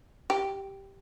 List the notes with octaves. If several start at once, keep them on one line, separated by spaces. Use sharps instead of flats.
G4